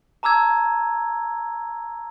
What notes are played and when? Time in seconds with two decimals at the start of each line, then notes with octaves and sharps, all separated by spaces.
0.23 A5 A#5 D6 E6 G#6